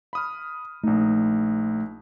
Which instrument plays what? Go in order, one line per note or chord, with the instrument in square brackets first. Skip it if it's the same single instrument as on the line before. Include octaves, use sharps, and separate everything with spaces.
[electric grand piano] B5 D#6 F6
[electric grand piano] A#1 D#4 [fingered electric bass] A3